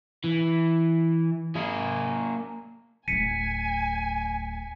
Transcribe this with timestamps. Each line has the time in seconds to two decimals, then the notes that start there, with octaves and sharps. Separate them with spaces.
0.24 E3
1.55 A#3 G#4
3.08 D1 A3 G#5 B6 C#7 D#7